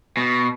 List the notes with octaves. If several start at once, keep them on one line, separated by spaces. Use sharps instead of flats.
B2